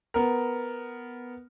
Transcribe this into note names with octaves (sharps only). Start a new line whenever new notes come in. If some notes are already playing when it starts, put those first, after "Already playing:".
B3 A#4